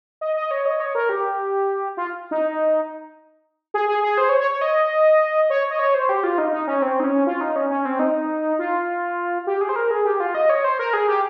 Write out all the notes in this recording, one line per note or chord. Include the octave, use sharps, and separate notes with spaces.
D#5
D#5
C#5
D#5
C#5
A#4
G4
F4
D#4
G#4
G#4
G#4
C5
C#5
C#5
C#5
D#5
C#5
D#5
C#5
C5
G4
F4
D#4
D#4
C#4
C4
D#4
C#4
F4
D#4
C#4
C#4
C4
D#4
F4
G4
G#4
C5
A#4
G#4
G4
F4
D#5
C#5
C5
A#4
G#4
G4